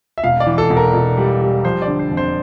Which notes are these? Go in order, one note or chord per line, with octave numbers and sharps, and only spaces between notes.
E5
E1 F5
D5
E3
A4
E1
A#4
E1
G3
G3
F3 C5
D5
D3
C5
F2
C5